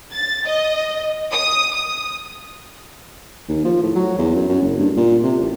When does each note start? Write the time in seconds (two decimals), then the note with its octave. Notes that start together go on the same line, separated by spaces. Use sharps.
0.13 A6
0.46 D#5
1.32 D#6
1.73 D#6
3.48 D#2
3.65 F3
3.82 A2
3.95 F#3
4.18 E2
4.36 F#2
4.49 F#2
4.62 F#1
4.80 G2
4.97 A#2
5.23 C3
5.40 A1